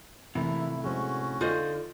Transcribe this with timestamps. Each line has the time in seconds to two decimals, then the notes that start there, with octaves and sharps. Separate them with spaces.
0.35 A2 C3 E3 A#3 E4 A#4
0.84 G#3 C#4 F#4 C5
1.41 D3 D#4 F4 C5 D#5